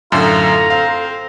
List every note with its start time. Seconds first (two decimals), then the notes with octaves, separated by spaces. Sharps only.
0.12 F#2 A2 D3 F4 A4 A#5
0.70 C4 F5